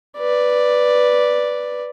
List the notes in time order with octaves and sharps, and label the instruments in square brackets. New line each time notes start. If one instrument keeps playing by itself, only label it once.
[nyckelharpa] B4 D5